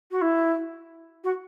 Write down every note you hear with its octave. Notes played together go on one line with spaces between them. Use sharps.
F#4
E4
F#4